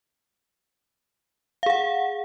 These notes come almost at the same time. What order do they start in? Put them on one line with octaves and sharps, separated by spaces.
F5 G#4 F#5